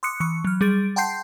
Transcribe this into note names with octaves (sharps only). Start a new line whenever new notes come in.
C6 D6 D#6 F#6 C#7
E3 C#6 C#7
F#3 F6
G3 G#4 A6 D7
F#5 G5 A5 C6 G6 C7